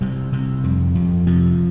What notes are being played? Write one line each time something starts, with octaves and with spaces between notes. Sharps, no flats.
C3 G3
C3
F2
F2
C3 F3